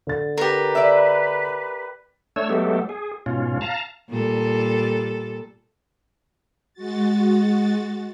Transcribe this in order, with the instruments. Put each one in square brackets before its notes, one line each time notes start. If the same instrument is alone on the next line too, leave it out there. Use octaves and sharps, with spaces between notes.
[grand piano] D3 A6
[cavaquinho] G4 A#4 [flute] B4
[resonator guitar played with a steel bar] D5 E5
[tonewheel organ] A3 D4 C#5 E6
F#3 G#3 A3 B3 G4 A4
G#4
G#2 B2 C#4 F4
F5 A5 A#5
[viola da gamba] A#2 G3 A4
[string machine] G#3 F#4 A6